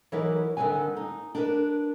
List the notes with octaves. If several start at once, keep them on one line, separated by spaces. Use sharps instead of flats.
E3 F#3 D#4 E4 A#4 B4
D3 D#3 G3 C4 B4 G#5
D#4
D4 A#4 B4